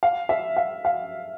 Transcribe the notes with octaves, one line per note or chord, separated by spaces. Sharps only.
F5
E5
F5
F5